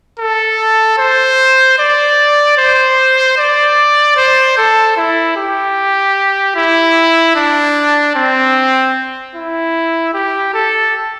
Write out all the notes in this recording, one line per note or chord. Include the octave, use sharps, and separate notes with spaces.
A4
C5
D5
C5
D5
C5
A4
E4
G4
E4
D4
C4
E4
G4
A4